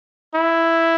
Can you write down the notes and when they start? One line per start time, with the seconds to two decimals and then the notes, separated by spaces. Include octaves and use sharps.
0.35 E4